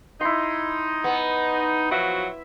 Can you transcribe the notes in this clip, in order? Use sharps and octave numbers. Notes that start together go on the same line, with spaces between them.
D#4 E4 C6
B3
F3 F#3 F#4 E5